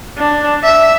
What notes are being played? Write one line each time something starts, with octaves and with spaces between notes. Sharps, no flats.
D4
E5